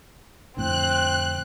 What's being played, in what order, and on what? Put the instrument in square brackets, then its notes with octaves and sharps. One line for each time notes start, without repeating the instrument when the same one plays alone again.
[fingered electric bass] F2 A2 D3 [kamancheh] C4 [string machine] F#6